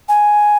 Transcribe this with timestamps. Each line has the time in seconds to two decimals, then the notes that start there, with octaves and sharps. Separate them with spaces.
0.09 G#5